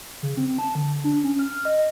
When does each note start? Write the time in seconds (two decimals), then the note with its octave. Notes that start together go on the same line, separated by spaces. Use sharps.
0.23 C#3
0.37 C4
0.59 A5
0.75 D3
1.04 D4
1.24 C#4
1.39 F6
1.65 D#5